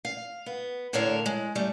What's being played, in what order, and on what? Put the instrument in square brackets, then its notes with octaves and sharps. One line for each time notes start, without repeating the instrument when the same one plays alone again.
[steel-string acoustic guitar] F5
B3
A2 D3 A4 A#4 C#5 F5
G#3
G3 A3